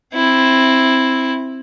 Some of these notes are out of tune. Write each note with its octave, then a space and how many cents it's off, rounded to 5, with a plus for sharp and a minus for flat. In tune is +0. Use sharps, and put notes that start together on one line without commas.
C4 +10 E4 +0